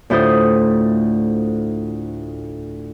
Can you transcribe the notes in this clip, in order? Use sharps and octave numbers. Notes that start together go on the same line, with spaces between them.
D2 A2 F4 C5 D#6